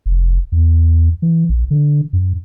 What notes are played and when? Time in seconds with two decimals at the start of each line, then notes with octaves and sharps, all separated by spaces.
0.06 F1
0.52 E2
1.22 E3
1.49 A#1
1.71 D3
2.13 F#2